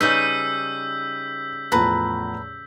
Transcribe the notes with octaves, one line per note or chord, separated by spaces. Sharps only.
C#3 G3 D#4 B4 E6 G6 B6
E2 A2 F3 B4 A5 A#5